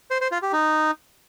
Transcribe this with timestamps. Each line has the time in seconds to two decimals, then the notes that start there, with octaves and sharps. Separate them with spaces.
0.11 C5
0.21 C5
0.32 F4
0.42 G4
0.53 D#4